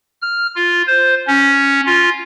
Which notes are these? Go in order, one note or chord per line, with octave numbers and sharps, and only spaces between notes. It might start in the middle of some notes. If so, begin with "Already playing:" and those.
F6
F4
C5
C#4
F4